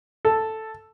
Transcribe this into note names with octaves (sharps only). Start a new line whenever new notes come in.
A4